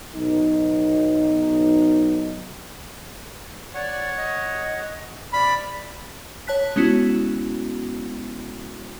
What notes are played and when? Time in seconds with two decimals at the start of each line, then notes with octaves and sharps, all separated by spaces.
0.15 B1 D#4
3.75 C#5 D5 F#5 C#6
4.17 D#5
5.33 C3 D5 B5 F6
6.47 C#5 A5 F#6 B6
6.76 G#3 B3 C#4 E4 F#4